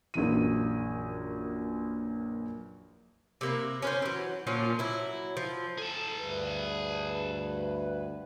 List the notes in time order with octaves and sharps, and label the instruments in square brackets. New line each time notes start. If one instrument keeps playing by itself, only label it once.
[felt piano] A#1 F#2 E3 D#7
[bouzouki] C3 A#3 E4
C#4 B4 C5
E3 F#3
A#2 F3 C#4 F4
F#3 E4
F3
[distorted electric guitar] G#4 A5 [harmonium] A4
[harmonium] D2 G2 B4